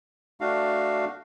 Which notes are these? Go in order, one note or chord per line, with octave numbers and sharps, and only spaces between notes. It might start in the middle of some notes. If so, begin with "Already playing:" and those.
A3 D4 F#4 F5